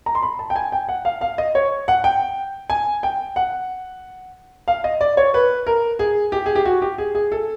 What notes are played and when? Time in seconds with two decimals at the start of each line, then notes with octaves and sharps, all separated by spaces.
0.06 A#5
0.15 C6
0.23 B5
0.39 A5
0.50 G5
0.56 G#5
0.72 G5
0.89 F#5
1.05 F5
1.21 F5
1.38 D#5
1.55 C#5
1.88 F#5
2.04 G5
2.70 G#5
3.03 G5
3.36 F#5
4.68 F5
4.84 D#5
5.01 D5
5.17 C#5
5.34 B4
5.67 A#4
5.99 G#4
6.32 G4
6.46 G#4
6.55 G4
6.65 F#4
6.82 G4
6.98 G#4
7.15 G#4
7.32 A4